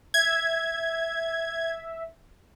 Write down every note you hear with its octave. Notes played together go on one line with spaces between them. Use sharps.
E5 G#6